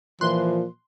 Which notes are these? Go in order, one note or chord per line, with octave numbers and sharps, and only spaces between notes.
A#2 E3 F3 C6 F#6